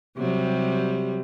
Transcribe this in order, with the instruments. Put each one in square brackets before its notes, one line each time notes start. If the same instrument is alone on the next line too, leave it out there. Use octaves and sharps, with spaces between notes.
[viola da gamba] C3 F#3 G3